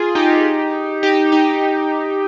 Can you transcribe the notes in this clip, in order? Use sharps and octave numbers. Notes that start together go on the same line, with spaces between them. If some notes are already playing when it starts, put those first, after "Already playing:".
Already playing: F4 G#4
D#4 G4
D#4 G4
D#4 G4